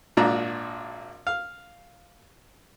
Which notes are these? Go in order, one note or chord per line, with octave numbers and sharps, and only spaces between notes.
G#1 A#2 D4 A#5
F5